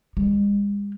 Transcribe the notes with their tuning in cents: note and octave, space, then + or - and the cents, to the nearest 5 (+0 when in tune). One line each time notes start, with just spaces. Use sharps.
G#3 -45